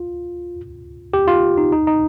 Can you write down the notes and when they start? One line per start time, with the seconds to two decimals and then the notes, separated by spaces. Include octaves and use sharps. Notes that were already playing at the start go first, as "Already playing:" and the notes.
Already playing: F4
1.14 G4
1.28 F4
1.58 D#4
1.72 D#4
1.87 D#4